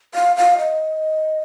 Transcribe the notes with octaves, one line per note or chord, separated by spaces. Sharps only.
F5
F5
D#5